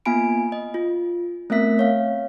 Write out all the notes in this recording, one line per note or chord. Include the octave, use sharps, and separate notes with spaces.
A#3 B3 F4 G#5 B5 D7
D#5
F4
A3 B3 C4 A#4 E5 B6
C#5 F5